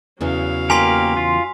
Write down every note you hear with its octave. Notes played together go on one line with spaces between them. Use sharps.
E2 C#3 E3 F#3 F5
A#3 G4 A#4 G#5 C6 B6
F4